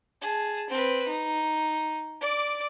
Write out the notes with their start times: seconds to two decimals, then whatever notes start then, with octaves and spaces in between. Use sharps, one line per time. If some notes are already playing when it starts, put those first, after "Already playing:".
0.21 G#4 A5
0.69 C4 B4
1.08 D#4
2.21 D5 D6